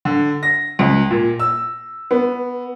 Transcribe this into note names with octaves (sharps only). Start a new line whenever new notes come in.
D3
A#6
C#2
A#2
E6
B3